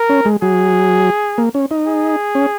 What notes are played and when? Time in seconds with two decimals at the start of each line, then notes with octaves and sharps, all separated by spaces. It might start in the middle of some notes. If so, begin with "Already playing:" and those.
Already playing: A#4
0.09 C#4
0.25 G#3
0.42 F#3 G#4
1.38 A#3
1.54 C#4
1.71 D#4
1.87 G#4
2.35 C#4